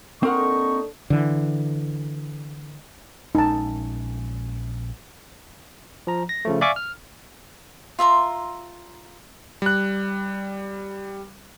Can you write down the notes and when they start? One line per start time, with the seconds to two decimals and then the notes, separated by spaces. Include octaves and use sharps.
0.23 A#3 C4 D4 D#4 A4 A#4 F#5 C#6
1.10 D3 E3
3.35 A#1 G#3 C#4 D#4 A5
6.07 F3 A#5
6.29 A#6
6.45 C#3 F3 A3
6.61 D5 E5 F5 G#5 C#6 D6
6.76 F6
7.99 F4 E5 A#5 C6
9.62 G3 F#6